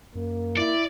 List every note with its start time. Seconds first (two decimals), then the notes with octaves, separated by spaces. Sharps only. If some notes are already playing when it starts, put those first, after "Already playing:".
0.15 F#2 A#3
0.57 E4 D5